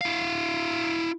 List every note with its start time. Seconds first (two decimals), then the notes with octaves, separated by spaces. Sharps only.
0.01 E4 F5